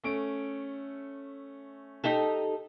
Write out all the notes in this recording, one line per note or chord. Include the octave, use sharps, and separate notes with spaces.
A3 C#4 D7
D#4 G4 A4